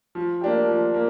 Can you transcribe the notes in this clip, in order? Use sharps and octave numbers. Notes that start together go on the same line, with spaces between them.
F3
A#3 D4 G4
F3
A#3